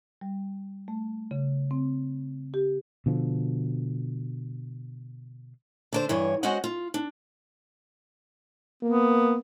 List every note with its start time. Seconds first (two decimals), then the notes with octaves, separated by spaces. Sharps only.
0.21 G3
0.88 A3
1.31 C#3
1.71 C4
2.54 G4
3.06 B2 D3 F3
5.93 D3 D4 C5
6.09 G2 E3 C#5
6.43 G#3 C#4 F#4 C5 D#5 F#5
6.64 F4
6.94 D4
8.83 A#3 B3